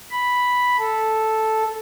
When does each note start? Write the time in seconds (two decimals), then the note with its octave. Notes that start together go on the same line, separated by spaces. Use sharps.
0.11 B5
0.79 A4